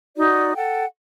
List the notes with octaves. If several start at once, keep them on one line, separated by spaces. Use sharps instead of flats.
D#4 F#4 D5
A4 F#5 G5